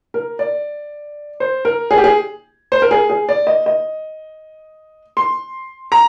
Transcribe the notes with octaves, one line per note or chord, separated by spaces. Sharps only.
A#4
D5
C5
A#4
G#4
G4
G#4
C5
A#4
G#4
G#4
D5
D#5
D#5
C6
A#5